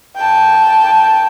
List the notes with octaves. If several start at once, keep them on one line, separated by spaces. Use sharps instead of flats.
G5 A5